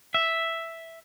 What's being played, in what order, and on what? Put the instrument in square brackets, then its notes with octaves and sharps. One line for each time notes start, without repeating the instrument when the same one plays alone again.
[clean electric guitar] E5